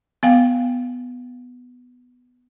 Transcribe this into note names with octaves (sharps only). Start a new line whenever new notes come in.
B3 F5 G5